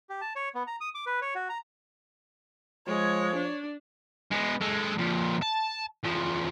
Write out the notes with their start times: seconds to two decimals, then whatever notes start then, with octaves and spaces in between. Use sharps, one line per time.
0.09 G4
0.21 A5
0.36 C#5
0.55 B3
0.67 A#5
0.81 D#6
0.95 D6
1.06 B4
1.22 C#5
1.35 F#4
1.49 A#5
2.87 F3 G#3 C#5
3.35 D4
4.31 G#3 B3
4.61 G#3 A4
4.98 F2 A#2
5.42 A5
6.04 E2 F3